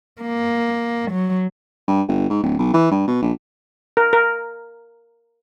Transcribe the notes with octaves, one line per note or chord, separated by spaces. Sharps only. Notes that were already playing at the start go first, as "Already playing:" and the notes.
A#3
F#3
G2
G1
G#2
D1
B1
E3
G2
B2
A#1
A#4
A#4